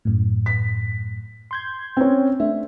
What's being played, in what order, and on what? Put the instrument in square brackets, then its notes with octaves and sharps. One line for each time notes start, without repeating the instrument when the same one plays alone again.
[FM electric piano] F#2 A2
[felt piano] B6
[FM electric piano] C6 G6 G#6
[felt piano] C4 C#4
[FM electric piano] A3 D4 [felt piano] E5